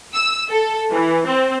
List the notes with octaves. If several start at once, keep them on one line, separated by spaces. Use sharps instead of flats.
E6
A4
E3
C4